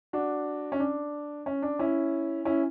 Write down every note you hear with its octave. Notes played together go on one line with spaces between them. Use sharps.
D4 F#4
C#4
D4
C#4
D4
C#4 E4
C#4 E4